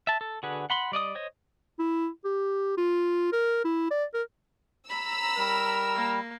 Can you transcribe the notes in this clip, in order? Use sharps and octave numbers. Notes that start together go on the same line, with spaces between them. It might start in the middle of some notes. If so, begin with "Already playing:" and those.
E5 A5
A4
D3 F#4 G#4 B4
F#5 B5 C6
G3 D5 D#5 D#6
C5 C#5 D#5
E4
G4
F4
A#4
E4
D5
A#4
A#5 B5 E6
G3 A#4
A#3